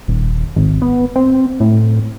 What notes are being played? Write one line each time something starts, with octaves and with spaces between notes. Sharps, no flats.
D#1
G#1
B3
C4
A2